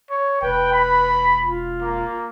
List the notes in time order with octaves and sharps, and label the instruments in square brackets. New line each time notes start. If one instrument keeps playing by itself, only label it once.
[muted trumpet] C#5
[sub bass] E1 [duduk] B4 [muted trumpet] G5
[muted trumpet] B5
[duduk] F4
[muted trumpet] A#3